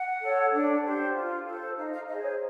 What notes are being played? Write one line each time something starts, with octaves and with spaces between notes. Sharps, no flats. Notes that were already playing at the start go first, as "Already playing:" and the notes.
Already playing: F#5
A4 C#5
D4
G4 C5
F4
A4 C5
D#4 F5
F5
G#4 C5 D#5
C#5